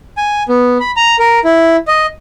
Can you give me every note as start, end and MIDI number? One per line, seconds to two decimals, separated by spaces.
0.17 0.43 80
0.49 0.78 59
0.80 0.91 83
0.96 1.16 82
1.19 1.39 70
1.44 1.76 64
1.88 2.06 75